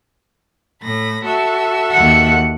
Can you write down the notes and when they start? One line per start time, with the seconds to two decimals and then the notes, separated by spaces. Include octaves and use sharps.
0.82 A2 B5 A#6
1.24 F#4 A4 E5
1.92 D#2 F#5